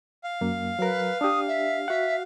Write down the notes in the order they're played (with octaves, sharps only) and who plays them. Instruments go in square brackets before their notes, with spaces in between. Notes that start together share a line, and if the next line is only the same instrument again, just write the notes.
[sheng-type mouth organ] F5
[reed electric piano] F#2 A#3
[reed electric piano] F#3 A#4 [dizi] B4
[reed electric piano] D4 G4 [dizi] D#6
[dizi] E5
[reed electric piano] F#4 F#5 [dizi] E5